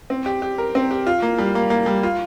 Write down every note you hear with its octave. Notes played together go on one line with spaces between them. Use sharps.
C4
G4
G4
A#4
C4
G4
F4
A#3
G3
A#3
A#3
G3
F4